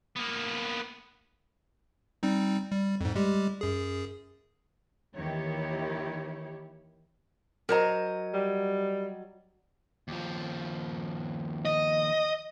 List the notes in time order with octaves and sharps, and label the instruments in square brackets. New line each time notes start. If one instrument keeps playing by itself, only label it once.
[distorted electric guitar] A#3 B3
[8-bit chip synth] G3 C4 D#4
G3
F2 G#2
G3 G#3 G4
F#2 G#4
[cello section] D#2 D#3 E3 E4 G4 C#5
[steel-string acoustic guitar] F#3 D#5 [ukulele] A#4 C5 A#5
[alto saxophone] G3
[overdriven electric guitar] D#2 F3
[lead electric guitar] D#5